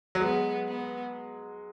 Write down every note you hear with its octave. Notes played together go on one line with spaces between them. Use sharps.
F#3
G#3 B3
B3